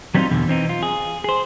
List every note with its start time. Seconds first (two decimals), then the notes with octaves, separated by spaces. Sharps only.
0.15 F#3 G3 B3 C4 D#4 F4
0.30 E2 B2 D3
0.48 E3 C4 C#4 D#4
0.69 F4
0.83 G#4
1.24 G#4 C5